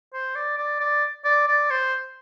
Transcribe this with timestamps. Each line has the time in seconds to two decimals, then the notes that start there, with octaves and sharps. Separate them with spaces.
0.13 C5
0.35 D5
0.58 D5
0.80 D5
1.24 D5
1.48 D5
1.70 C5